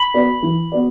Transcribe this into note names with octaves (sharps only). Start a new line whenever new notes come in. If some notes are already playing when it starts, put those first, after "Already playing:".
Already playing: B5
B3 F#4 B4 D5
E3
B3 F#4 B4 D5